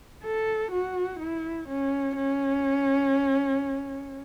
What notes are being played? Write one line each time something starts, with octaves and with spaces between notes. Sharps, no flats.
A4
F#4
E4
C#4
C#4